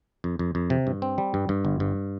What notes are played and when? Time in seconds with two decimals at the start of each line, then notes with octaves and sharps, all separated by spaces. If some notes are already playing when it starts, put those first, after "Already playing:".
0.24 F2
0.39 F2
0.55 F2
0.70 C3
0.87 G2
1.02 C4
1.18 G3
1.34 G2
1.49 G2
1.65 G1
1.80 G2